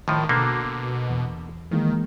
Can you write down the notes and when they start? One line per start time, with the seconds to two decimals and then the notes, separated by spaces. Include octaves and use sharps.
0.08 A2 D#3 F3
0.29 B2 D3 A3 A#3
1.10 E2
1.71 D#3 E3 G#3 A#3